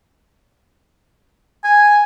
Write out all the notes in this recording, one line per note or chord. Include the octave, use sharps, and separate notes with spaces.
G#5